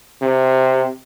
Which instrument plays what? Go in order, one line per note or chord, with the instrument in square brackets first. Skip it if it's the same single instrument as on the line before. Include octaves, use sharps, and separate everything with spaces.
[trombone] C3